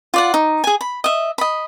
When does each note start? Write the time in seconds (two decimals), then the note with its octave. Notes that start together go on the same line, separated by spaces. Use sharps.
0.14 F4 D5 F#5
0.34 D#4
0.64 G#4 G#5
0.81 B5
1.04 D#5 E5
1.38 D#5 B5